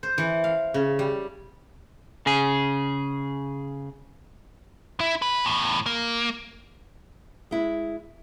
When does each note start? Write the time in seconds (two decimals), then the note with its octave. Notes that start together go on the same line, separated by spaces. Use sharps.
0.03 C5
0.18 E3
0.44 F5
0.74 C#3
0.99 G3
2.26 C#3 G#4
5.01 E4
5.22 B4
5.45 E2 A2
5.86 A#3
7.51 G#3 E4